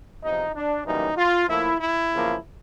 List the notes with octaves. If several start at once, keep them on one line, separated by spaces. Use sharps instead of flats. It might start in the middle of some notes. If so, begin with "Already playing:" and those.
E2 C3 F3 D#4
D4
F#2 C#3 E3 G3 A#3 D#4
F4
A2 F3 A#3 E4
E4
E2 C#3 F3 A#3